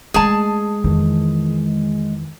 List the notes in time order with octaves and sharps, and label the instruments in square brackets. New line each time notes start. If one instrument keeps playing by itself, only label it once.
[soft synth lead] G#3 [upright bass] A3 C#4 [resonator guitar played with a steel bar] G#4 A5
[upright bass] F2 E4 [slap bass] D#3 E3